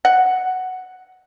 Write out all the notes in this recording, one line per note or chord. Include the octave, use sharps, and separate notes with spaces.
F#5